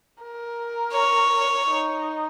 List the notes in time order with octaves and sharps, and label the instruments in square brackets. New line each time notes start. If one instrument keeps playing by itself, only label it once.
[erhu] A#4
[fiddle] C#5
[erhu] D#4